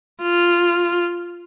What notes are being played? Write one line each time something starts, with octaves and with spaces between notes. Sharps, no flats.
F4